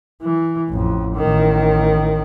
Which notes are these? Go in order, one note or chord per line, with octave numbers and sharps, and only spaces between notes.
E3
A1 F2
A1 D#3